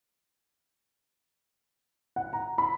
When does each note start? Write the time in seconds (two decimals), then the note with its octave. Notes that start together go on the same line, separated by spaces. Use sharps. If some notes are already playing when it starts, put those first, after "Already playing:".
2.16 F#5
2.33 A#5
2.58 B5